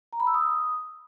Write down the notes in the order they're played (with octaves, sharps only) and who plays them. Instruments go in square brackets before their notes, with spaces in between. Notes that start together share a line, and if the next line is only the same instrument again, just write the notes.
[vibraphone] A#5
B5
E6
D#6